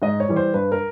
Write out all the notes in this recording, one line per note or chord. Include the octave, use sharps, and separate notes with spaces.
G#2 D#5
C#5
E3 G3
C5
G2 B4
A#4